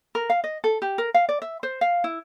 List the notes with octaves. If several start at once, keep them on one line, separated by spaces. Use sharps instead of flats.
A#4
F5
D#5
A4
G4
A#4
F5
D5
E5
C5
F5
E4